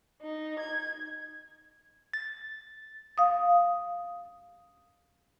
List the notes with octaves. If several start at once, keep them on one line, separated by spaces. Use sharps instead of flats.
D#4
G#6
A6
F5 D#6